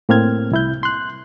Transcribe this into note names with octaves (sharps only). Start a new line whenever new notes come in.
A2 A#3 C4 F6 G#6
C2 E4 G6
C6 F#6